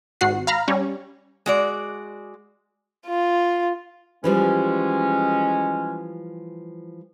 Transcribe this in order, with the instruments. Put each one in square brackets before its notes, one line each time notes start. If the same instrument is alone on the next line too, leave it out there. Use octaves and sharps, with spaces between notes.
[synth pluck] G#1 F#4 F#5 C7
F5 A#5 B5 F6
G3 C#4
[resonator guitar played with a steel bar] G#3 F#4 D5
[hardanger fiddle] F4
[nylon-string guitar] E3 F3 G3 [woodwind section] G#3 C#4